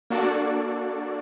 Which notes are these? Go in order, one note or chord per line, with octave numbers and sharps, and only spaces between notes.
A#3 D4 F#4 A4 D5